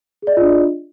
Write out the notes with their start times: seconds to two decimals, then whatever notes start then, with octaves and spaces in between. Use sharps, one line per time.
0.22 G#4
0.27 D5
0.32 D#5
0.37 F4
0.42 D4